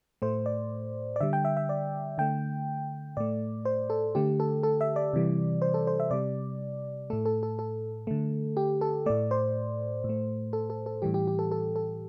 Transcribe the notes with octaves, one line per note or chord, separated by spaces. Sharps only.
A2 A3 C5
D5
D5
D3 G3 E5
G5
E5
E5
D5
D3 A3 G5
A2 A3 D5
C5
A4
D3 A3 G4
A4
A4
E5
D5
C3 E3 G3
C5
A4
C5
E5
C3 G3 D5
A2 A3 A4
A4
A4
A4
D3 A3
G4
A4
A2 A3 D5
C5
A2
A3
A4
A4
A4
A2 E3 G3 G4
G4
G4
A4
A4
A4